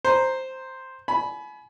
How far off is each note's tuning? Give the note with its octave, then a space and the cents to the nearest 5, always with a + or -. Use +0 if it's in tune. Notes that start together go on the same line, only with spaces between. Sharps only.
C5 +0 A#5 +0
G#5 +35 B5 +0